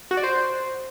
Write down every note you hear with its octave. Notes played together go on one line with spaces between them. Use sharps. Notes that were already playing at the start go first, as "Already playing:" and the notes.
F#4
D5
C5